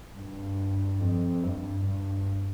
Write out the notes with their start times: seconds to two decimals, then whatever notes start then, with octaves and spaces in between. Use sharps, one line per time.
0.14 G2
1.00 F2
1.43 G2
1.85 G2